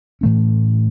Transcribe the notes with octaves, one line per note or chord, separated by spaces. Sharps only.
A2 E3 A3 C#4